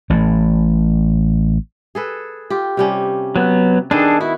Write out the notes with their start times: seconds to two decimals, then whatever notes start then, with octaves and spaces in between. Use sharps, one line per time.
0.10 A1 A2
1.95 G#4 A4 B4
2.50 F4 G4
2.77 C3 G3 C#4
3.36 F#3 B3
3.91 D#3 B3 D4 G#4 A4
4.21 E4 F#4